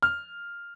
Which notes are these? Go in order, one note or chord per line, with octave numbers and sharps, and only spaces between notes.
F6